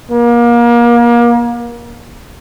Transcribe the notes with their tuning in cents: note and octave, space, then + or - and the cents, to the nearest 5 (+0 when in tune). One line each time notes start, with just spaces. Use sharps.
A#3 +30